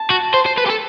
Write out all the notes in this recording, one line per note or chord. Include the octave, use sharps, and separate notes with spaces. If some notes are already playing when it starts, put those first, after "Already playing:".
Already playing: A5
F#4
C5
C5
B4
G4
A4